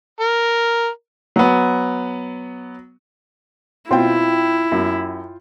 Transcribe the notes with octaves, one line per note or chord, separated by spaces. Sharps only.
A#4
F#3 B3
B2 C4 E4 F4 G5
F#2